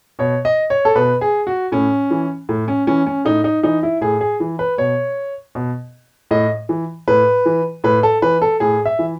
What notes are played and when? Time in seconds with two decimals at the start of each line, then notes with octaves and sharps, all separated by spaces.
0.19 B2 C#5
0.45 D#5
0.70 C#5
0.85 A4
0.96 B2 B4
1.21 G#4
1.47 F#4
1.72 A2 C#4
2.11 E3
2.49 A2
2.68 C#4
2.87 E3 C#4
3.07 C#4
3.25 A2 D#4
3.44 D#4
3.63 E3 D#4
3.83 E4
4.01 A2 G#4
4.21 G#4
4.40 E3
4.59 B4
4.78 B2 C#5
5.55 B2
6.31 A2 D#5
6.69 E3
7.08 A2 B4
7.46 E3
7.84 A2 B4
8.03 A4
8.22 E3 B4
8.42 A4
8.60 A2 G#4
8.85 E5
8.99 E3